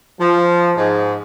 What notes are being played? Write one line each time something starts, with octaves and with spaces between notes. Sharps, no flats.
F3
G#2